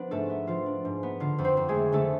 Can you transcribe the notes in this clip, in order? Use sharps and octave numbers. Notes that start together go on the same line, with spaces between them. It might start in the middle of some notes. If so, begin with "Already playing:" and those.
Already playing: F3 B3 D4 B4
G#2 A3 A4
B3
F3 F4
D4
G#2
B3
D3 F4
F2
C4 C5
F2
G#3 G#4
A3
D3 A3 A4